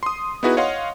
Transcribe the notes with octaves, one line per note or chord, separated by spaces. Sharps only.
C6 D#6
B3 D#4 E4 F#4 G#4 B4
C#5 D#5 F5 F#5 C6